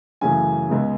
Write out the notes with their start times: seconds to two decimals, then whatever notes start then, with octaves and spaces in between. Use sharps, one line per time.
0.21 F#2 C#3 E3 A3 G#5
0.69 C#2 C#3 G#3 B3